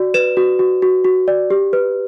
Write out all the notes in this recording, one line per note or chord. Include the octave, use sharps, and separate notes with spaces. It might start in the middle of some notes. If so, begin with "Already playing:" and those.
Already playing: F#4 D5
B4 E7
F#4
F#4
F#4
F#4
D5
G4
B4